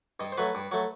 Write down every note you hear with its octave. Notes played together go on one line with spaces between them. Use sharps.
G2 D#5
C5
F#3 A3 B4
G2
F#3 A3